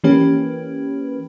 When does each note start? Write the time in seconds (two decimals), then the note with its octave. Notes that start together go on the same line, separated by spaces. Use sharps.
0.04 E3 A#3 C#4 G4 B4